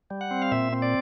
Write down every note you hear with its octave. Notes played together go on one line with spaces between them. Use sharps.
G3
F#5
C4
F5
A#2 E5
C4
D5